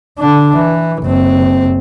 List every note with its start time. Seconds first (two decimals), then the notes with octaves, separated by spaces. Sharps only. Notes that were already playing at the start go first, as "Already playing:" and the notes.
0.19 D3 D4
0.56 E3
1.03 F#1 C4